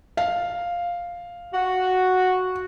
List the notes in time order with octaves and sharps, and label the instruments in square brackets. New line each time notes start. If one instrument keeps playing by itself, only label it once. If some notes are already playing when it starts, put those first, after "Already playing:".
[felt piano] F5
[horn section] F#4